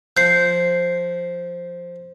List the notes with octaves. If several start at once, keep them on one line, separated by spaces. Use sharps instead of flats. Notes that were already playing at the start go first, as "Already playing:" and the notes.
F3 G6 C7